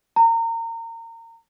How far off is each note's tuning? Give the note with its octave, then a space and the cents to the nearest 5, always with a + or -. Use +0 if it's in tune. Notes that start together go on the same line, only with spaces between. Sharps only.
A#5 -30